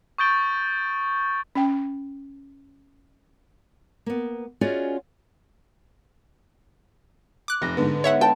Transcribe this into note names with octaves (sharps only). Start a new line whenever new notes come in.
C#6 D#6 G6 A6 D7 G7
C#4 G5
A#3 B3
C#4 F4 F#4 G#4 D5 D#5
D6 F#6
F1 A#6
G#2 D3 B3
C#5 E5 F#5
G5 A5